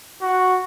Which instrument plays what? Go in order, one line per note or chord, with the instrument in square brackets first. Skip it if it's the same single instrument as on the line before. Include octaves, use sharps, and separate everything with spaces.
[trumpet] F#4